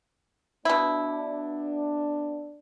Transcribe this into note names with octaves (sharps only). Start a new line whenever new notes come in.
B2 B3 D4 E4